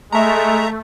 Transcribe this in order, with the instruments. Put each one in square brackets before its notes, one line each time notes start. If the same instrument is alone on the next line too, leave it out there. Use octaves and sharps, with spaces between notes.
[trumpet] G#3 [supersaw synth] A3 [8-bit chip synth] E5 A#5